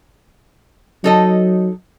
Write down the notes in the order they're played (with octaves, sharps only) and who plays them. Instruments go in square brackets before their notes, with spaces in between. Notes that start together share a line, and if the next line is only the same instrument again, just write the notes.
[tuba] F#3 [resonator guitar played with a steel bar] D#4 A4 D#5